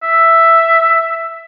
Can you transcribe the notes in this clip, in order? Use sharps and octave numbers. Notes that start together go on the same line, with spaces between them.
E5